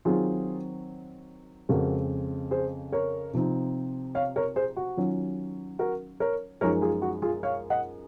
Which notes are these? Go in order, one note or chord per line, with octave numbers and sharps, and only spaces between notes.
D#3 F#3 C4 F4 G#4
F2 C#3 G#3 C4 F#4 A#4
G#4 C5
A#4 C#5
C3 F3 C4 D#4
C#5 F5
A#4 C#5
G#4 C5
F#4
D#3 F#3 C#4 F4
F#4 A#4
A#4 C#5
F#2 F3 G#3 D#4 A#4 C#5
F4 G#4
F#4
F4 G#4
C#5 F5
D#5 F#5